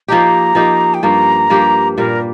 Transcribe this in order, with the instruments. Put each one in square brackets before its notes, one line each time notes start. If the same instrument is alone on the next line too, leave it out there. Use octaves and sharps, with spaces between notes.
[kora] F3 A#3 D#4 G4 [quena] A#5
[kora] F3 A#3 D#4 G4
[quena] G5
[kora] G2 F3 A#3 G4 [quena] A#5
[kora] G2 F3 A#3 G4
[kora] A#2 G3 A#3 [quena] A#4